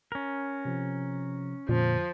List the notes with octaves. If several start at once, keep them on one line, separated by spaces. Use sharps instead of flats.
C#4 A#4
C3 F3
F2 A#2 D3 F3